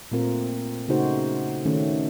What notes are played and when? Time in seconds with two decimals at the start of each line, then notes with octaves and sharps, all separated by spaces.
0.11 A#2 A3 C4 F4 A#4
0.88 C#3 A3 D#4 F#4 C5
1.65 D#3 A3 C#4